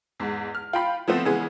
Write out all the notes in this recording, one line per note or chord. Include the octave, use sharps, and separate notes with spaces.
E2 G#2
F6
F4 G5 B5
F3 A3 B3 C4
C#3 E3 G#3 B3